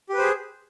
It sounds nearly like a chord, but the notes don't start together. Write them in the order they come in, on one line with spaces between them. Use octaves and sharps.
G4 B4 C5 G#4